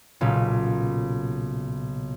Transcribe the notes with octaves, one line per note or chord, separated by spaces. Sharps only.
B1 A#2 C#3